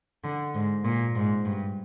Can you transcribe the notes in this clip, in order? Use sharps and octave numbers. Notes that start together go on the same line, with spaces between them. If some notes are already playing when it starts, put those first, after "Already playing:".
D3
G#2
A#2
G#2
G2